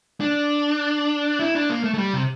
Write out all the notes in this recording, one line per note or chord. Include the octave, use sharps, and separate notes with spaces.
D4
E4
D4
A#3
A3
A3
G3
C3